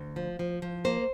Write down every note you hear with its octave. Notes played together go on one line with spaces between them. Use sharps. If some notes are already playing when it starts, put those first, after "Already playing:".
Already playing: D2
F3
F3
F3
A#3 C5